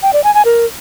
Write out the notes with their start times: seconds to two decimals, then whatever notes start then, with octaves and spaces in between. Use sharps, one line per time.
0.03 G5
0.13 D5
0.24 G#5
0.34 G#5
0.45 A#4